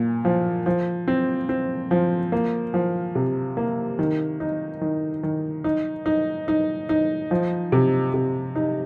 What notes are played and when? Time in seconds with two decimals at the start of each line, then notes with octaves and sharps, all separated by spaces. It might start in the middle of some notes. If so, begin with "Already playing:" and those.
Already playing: A#2
0.25 F3
0.66 F3
1.08 C4
1.49 C4
1.91 F3
2.32 A#3
2.74 F3
3.15 C3
3.57 A#3
3.99 D#3
4.40 D#4
4.81 D#3
5.23 D#3
5.64 D#4
6.06 D#4
6.48 D#4
6.89 D#4
7.31 F3
7.72 C3
8.14 C3
8.56 D#4